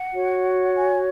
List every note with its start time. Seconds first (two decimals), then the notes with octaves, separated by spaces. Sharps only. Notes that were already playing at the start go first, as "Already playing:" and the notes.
Already playing: F#5
0.12 F#4 C#5
0.76 G#5